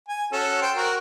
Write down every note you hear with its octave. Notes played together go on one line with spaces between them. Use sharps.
G#5
C#4 F#4 A4
C5 G5
F#4 A#4